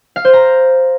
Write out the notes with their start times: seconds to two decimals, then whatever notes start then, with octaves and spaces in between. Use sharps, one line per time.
0.16 F5
0.25 C5
0.33 A#5